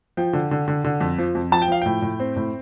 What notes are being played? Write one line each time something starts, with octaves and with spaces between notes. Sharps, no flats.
F3 G5
D3
D3
D3
D3
F2
F3
F2
F3 A5
G5
F3 F5
A2 G5
A2
C4
A2